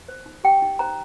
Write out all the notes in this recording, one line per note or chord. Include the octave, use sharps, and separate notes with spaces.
C5
D#4
G4 G5
D#4
C5 A#5